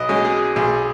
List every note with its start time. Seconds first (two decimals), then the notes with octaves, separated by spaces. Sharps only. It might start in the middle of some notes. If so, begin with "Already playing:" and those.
Already playing: B1 B4 D#5
0.09 B2 G#3 C#4
0.25 G#4
0.56 B1 G#4